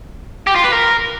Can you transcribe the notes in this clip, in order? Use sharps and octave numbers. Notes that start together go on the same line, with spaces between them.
G4
F4
B4
A#4